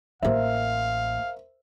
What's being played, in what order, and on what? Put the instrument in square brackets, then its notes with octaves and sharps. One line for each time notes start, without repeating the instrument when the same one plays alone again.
[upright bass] A1 A#3 [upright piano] A#4 C5 E5 [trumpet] F5